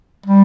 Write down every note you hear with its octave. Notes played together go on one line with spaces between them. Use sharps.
G3